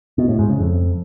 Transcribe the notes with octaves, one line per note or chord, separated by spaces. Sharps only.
B2
A2
G#2
C#3
F2